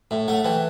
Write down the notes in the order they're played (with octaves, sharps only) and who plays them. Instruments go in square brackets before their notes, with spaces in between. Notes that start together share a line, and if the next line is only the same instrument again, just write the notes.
[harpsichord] A2 [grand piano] E5
[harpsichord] A3 [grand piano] F#5
[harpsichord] E3 [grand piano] G5